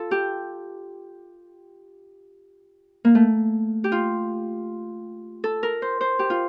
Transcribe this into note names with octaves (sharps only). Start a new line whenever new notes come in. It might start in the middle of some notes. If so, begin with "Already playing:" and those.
Already playing: F4 A4
G4
A#3
A3
G4
F4
A4
A#4
C5
C5
G4
F4